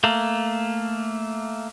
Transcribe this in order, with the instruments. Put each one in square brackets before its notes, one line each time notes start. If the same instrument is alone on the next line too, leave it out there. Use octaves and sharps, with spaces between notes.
[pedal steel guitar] A3 A#3